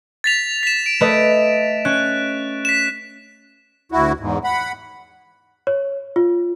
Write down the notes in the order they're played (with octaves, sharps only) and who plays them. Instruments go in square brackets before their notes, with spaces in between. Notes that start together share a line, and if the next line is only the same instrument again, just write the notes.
[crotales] A6 B6 F7
B6 E7
D7
[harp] A3 B4 D#5
[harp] C#4 [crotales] F#6
[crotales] B6 E7
[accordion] D2 E4 F#4
E2 G#2
F#5 B5
[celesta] C#5
F4